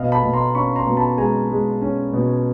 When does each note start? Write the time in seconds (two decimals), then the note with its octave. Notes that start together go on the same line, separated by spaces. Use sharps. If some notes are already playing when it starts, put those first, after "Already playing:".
Already playing: B2 D#5 F5
0.12 A5 B5
0.23 B2
0.33 A#5 C6
0.55 C#4 B5 C#6
0.76 A#5 C6
0.86 B2
0.97 A5 B5
1.18 G#3 G#5 A#5
1.50 G#3
1.81 C#4
2.13 B2